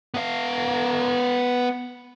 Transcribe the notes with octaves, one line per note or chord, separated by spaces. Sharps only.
B3 F5